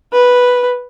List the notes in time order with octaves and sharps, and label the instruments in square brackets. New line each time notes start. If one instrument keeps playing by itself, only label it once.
[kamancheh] B4